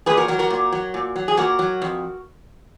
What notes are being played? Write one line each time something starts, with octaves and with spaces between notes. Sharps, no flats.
A#2 G#4 B4
F#4 A#4
F#3 F#4 A#4
F#4 A#4
A#2
F#3
A#2
F#3
G#4
A#2 F#4 A#4
F#3
F2